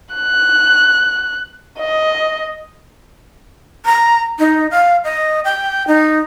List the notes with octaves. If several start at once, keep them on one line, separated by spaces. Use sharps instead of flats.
F#6
D#5
A#5
D#4
F5
D#5
G5
D#4